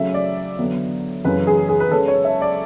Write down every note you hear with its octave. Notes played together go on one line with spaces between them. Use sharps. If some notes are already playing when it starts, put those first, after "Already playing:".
Already playing: C#3 F#3 A3 C#4 E5
D5
D3 F#3 B3
F#2 C#3 E3 A3 C#4 B4
G#4
G#4
B4
C#3 G#3 C#4 A4
C#5
E5
D5